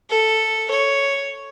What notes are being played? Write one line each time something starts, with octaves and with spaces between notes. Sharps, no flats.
A4
C#5